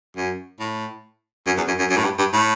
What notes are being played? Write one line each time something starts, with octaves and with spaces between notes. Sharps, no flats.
F#2
A2
F#2
E2
F#2
F#2
F#2
A2
G2
G2
A2